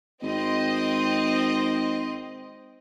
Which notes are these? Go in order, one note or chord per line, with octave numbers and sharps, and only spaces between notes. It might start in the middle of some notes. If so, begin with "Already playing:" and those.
G#1 C4 D#5